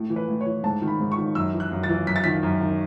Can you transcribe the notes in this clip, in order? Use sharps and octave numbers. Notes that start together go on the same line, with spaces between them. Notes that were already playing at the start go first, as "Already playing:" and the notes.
Already playing: A2
E3
B4
A2
C#5
E3
G#2 A5
D#3
B5
G#2
C#6
D#3
F#2 E6
E3
F#6
F#2
A6
E3
F#2 B6
A6
D#3 B6
F#2
D#3